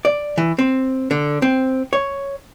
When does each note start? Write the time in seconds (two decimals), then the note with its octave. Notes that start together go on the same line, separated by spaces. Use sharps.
0.05 D5
0.38 E3
0.58 C4
1.11 D3
1.42 C4
1.93 C#5